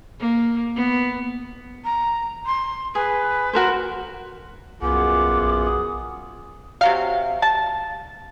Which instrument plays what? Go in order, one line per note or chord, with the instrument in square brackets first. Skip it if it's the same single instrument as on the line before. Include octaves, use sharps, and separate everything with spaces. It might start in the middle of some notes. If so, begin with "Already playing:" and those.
[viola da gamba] A#3
B3
[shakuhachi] A#5
C6
[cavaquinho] G#4 [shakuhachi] B4
[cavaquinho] F#4 A#4 C5
[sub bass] C2 [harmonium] F#2 B3 F4 [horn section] G#4 F#5 [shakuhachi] D6
[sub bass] A#1
[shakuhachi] D#6
[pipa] C3 F#3 F5
A5